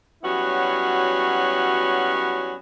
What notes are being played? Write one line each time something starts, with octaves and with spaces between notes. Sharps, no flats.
F#3 G3 B3 C#4 E4 F#4